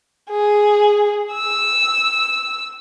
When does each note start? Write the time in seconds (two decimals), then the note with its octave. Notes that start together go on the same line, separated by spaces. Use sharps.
0.30 G#4
1.34 E6